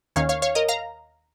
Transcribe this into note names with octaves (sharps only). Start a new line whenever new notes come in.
D#2 D#3 C#4 C#5 F5
C#5 F5
C#5 F5
A#4 D#5
F5 A#5